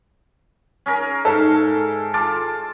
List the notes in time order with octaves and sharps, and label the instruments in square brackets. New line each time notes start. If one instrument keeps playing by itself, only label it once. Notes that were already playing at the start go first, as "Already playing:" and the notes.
[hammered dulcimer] C#4 G#4 A#4
[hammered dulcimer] G#2 E5 F5 [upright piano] A4
[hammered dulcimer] F4 A5 D6